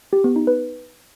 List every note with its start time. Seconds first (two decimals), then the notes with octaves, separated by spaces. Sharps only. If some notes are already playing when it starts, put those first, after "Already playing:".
0.13 G4
0.24 B3
0.36 D#4
0.47 B4